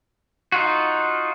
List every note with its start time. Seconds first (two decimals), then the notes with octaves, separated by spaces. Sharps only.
0.52 D#4 F4 F#4